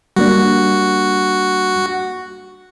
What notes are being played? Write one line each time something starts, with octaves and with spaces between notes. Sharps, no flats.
G3 A#3 D4 F#4